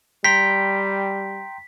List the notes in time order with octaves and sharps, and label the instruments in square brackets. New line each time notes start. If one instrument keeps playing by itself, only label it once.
[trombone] G3 [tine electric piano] G5 A#5 C6 [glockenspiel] B6